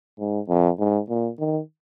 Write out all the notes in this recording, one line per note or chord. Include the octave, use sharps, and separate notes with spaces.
G#2
F2
G#2
A#2
D#3